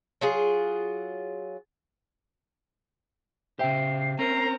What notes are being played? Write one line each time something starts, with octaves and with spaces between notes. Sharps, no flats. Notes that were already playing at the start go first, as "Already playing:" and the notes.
F#3 F4 G#4
C#3 G4 C5 E5 G5 C7
C4 C#4 A#4 A#5 C7